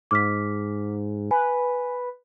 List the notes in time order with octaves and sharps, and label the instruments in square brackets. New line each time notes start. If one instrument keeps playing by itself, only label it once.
[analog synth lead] G#2 [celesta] D6 F6 B6
[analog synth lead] B4 [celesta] G#5